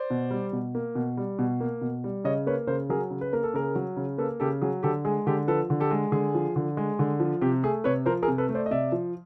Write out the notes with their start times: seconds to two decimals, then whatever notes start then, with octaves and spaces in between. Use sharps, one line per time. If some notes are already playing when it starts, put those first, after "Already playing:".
Already playing: C5 D5
0.10 B2
0.31 G3
0.53 B2
0.75 A#3
0.95 B2
1.17 G3
1.39 B2
1.60 A#3
1.81 B2
2.04 G3
2.24 C#3 C#5 D#5
2.46 A#3 B4 C#5
2.67 C#3 A#4 C5
2.89 F#3 G#4 A#4
3.10 C#3
3.21 B4
3.33 A#3 A#4
3.43 A4
3.54 C#3 G#4 A#4
3.75 F#3
3.97 C#3
4.18 A#3 A4 B4
4.40 C#3 G4 A4
4.62 F#3 G#4
4.83 D3 G4 A4
5.05 G#3 G#4
5.27 D3 G4 A4
5.48 F3 A4 B4
5.70 D3
5.80 G4 A4
5.91 G#3
6.12 D3 G#4
6.35 F3
6.56 D3
6.77 G#3
6.99 D3
7.20 F3
7.42 C3 G4
7.63 A3 G#4
7.84 C3 B4 C#5
8.06 F3 A#4 C5
8.23 G#4 A#4
8.28 C3
8.38 A4 B4
8.49 A3
8.54 C5 D5
8.66 D#5
8.71 C3 D5 E5
8.92 F3